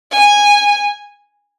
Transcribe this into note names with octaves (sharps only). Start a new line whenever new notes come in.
G#5